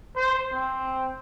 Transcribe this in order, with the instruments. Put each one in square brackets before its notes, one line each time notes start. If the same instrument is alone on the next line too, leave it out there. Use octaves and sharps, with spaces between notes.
[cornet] C5
C4